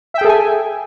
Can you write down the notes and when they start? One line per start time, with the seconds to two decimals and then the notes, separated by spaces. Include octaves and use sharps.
0.14 E5
0.18 G5
0.21 G#4
0.25 A4
0.28 G#5